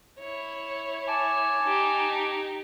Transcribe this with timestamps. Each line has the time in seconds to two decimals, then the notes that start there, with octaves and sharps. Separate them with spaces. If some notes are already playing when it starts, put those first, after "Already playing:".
0.19 E4 C#5
1.08 G#5 A5 D6
1.63 D#4 G4